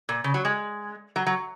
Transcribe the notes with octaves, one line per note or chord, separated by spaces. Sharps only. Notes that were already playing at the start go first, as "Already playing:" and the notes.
A#2
C#3
F#3
G#3
F#3
F#3